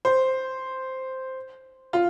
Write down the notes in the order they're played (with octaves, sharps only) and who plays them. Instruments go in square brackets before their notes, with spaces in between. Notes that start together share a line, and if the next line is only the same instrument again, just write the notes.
[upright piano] C5
F4